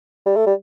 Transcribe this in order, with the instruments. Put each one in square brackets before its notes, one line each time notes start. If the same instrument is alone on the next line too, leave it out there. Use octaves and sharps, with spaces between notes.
[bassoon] G3
A3
G3